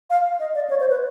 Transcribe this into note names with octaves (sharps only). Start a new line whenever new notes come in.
F5
D#5
D5
C#5
C5
B4